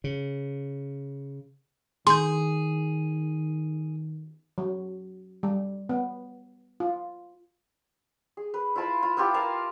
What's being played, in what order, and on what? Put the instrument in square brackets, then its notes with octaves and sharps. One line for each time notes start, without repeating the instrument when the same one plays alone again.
[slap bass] C#3
[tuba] D#3 [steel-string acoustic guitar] G#4 [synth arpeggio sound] C6 G6
[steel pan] F#3
G3
B3
F4
[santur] G#4
B4
E4 F4 A5 B5
F4
B3 E4 F4 G4
A#4 F5 G5 A5